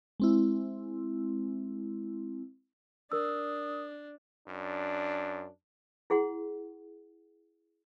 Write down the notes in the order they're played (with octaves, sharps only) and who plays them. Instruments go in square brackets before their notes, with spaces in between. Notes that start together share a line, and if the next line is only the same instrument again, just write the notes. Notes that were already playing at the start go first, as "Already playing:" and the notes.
[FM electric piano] G#3 C4 E4
[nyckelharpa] D4 [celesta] A#4 E6 [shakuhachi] D#6
[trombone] F#2 [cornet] D4
[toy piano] E4 G#4 F#5 C6